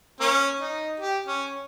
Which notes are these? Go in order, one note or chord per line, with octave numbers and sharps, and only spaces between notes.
A#3 C#4
D#4
G4
C#4